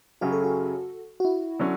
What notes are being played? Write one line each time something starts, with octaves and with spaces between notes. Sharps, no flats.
F#2 C#3 F#3 C#4 F#4 G4
A4
F#4
F#4
E4
D3 F#3 C#4